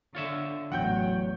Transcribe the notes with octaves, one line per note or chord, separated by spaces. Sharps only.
D3 F4 C#5 E5
A1 E2 F#3 F#5 G5 G6